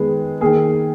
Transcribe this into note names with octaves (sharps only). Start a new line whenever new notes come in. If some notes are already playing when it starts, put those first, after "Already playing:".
Already playing: D#3 G#3 B3 G#4
D#3 A#3 G#4